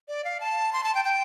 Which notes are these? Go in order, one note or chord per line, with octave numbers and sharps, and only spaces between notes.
D5
F5
A5
C6
A5
G5
G5